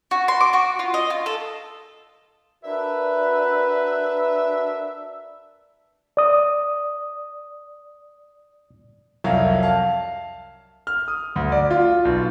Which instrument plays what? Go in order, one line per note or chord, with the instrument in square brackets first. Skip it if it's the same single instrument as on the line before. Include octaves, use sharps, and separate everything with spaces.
[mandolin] F#4
C6
D6
F#4
F4
D#5
F4
A4
[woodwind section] D4 E5 [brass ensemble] F#4 A#4 B4
[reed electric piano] D5 D#6
[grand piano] C2 F2 F#3 F5
F5 A5
F6
D#6
D2
D5
F4
B1